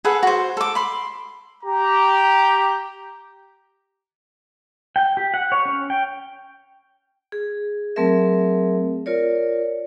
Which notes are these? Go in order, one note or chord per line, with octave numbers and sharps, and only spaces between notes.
G#4 A4 B4 F#5
F#4 C5
A4 D6
B5 C6
G4 A#5
G5
G4
F#5
C#5
C#4
G5
G#4
F#3 A3 C4 G#4 A#4 E5
F4 A#4 C#5 D5